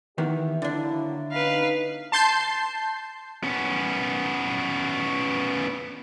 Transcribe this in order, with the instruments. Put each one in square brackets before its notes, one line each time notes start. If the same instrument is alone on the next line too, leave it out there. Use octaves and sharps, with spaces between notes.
[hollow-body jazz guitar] D#3 E3 B3 [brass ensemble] G4 E5
[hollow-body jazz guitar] D3 D4 [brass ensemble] F#3 A#3 E4
[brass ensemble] B3 C#4 D#4 [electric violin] B4 F5
[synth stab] A5 C6 G6 C7
[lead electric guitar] B3 C#4